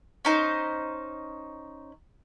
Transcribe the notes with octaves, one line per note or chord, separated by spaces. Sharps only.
C#4 D#4 C5